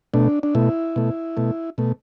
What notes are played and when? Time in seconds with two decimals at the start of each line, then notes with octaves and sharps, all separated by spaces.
0.14 B2 A3 D4
0.43 D4
0.55 B2 A3 E4
0.96 B2 A3
1.37 B2 A3
1.78 B2 A3